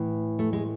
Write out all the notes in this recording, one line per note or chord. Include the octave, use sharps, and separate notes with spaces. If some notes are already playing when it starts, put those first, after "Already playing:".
Already playing: A2 E3
A3
G#3